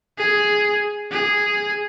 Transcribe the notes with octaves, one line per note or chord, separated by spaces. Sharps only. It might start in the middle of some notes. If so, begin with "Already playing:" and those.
G#4
G#4